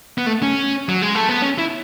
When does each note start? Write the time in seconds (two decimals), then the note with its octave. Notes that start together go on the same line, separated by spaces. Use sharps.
0.18 B3
0.26 A3
0.43 C#4
0.89 F#3
1.02 G#3
1.15 A3
1.29 B3
1.42 C#4
1.58 E4